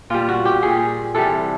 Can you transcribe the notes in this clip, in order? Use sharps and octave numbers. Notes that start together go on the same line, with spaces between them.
A#2 G3 F4
F#4
G4
A#2 G3 G#4
C3 E3 G3 A4